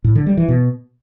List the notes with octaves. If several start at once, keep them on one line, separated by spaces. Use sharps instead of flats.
A2
D3
G3
E3
B2